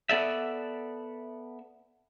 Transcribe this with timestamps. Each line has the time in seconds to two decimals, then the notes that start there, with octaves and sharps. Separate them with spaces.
0.09 B3 A4 D5 E5